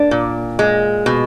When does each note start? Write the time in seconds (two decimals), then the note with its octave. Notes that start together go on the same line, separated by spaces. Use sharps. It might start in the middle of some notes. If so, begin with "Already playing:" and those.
Already playing: A#3 D4
0.11 A#2
0.59 G#3
1.06 B2